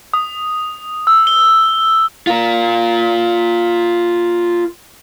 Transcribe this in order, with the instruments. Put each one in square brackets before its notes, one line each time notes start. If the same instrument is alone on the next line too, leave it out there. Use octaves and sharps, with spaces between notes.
[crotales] D#6
E6
G7
[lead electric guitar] F4 A#4